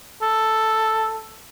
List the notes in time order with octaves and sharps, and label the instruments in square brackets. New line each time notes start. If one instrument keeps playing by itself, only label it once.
[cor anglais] A4